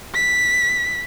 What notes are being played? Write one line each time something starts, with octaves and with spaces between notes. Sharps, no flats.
B6